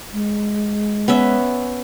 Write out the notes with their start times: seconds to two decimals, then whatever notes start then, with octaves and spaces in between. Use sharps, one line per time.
0.13 G#3
1.08 B3 C#4 E5